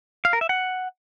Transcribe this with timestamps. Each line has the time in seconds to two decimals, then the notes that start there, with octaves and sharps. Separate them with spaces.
0.25 F5
0.33 A#4
0.41 E5
0.49 F#5